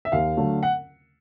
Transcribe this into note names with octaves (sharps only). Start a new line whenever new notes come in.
E5
D#2 F5
D3 F#3 A3
F#5